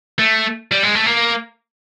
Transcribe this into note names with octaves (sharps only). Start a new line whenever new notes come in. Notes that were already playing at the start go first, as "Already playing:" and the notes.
A3
G3
G#3
A3
A#3